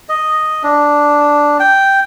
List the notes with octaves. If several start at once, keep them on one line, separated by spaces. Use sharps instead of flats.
D#5
D4
G5